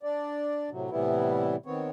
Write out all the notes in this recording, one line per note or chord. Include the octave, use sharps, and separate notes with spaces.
D4 D5
A2 C3 F#3
A2 C3 E3 G3 B3 E4
D#3 B3 C4 C#5